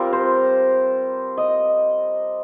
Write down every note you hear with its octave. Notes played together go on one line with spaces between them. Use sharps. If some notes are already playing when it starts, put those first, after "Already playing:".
Already playing: G3 C4 F4 A#4
C5
D#5